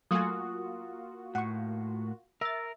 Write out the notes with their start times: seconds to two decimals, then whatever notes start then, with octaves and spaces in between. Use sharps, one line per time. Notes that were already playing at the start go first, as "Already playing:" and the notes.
0.11 F#3 A3 A#3 F4 F#4 G#5 D#6
1.35 A2 F#5 C#6
2.41 A#4 E5 E6 A6